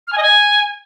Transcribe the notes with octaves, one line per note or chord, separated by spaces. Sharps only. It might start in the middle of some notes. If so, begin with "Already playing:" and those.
F6
G#5
D#5
G#5